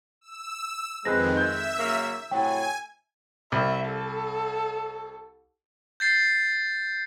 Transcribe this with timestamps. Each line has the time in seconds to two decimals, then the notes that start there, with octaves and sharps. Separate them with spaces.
0.21 E6
1.05 F2 D#3 G#3 C4 G#4 B4 F#6 A#6
1.37 E5 E6 G6 G#6
1.78 F#2 C#3 A#3
2.31 A2 C3 F#3 G5 G#5
3.52 C2 E5
3.86 A4
6.00 G6 A6 C7